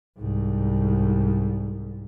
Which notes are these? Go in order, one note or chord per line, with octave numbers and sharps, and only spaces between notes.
C2 G#2